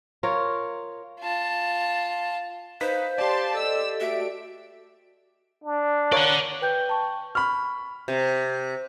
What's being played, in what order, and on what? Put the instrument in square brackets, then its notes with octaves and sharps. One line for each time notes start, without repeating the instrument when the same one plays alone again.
[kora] F4 A#4 C#5
[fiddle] F4 A5
[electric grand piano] D#4 B4 B6 [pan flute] C5 [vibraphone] F5
[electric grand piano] G4 D5 [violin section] A5 C6
[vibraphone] A4 D#5 [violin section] E6
[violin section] A3 D7 [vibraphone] F#4 [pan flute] E5
[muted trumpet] D4
[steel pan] A#4 C#5 F5 [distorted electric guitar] D5 F#5
[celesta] B4 G5 G6
G5 A5 C#6
[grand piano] B5 F6 [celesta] C#6
[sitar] C3